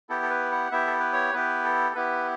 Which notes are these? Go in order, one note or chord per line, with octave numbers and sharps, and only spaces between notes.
B3 E4 G4 A4
A4
B4
F#5
B3 E4 G4 E5
A4
B4
C#5
B3 E4 G4 B4
A4
B3 E4 G4 B4